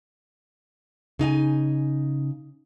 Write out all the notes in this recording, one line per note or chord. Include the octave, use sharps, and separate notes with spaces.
C#3 D#4 F5 G#5